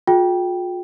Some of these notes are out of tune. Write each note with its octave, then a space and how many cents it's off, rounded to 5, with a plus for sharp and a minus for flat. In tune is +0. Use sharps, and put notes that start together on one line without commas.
F4 +45 G#4 +30 G5 +0